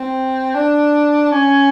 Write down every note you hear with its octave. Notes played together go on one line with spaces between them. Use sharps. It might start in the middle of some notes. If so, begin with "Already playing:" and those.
Already playing: C4
D4
C#4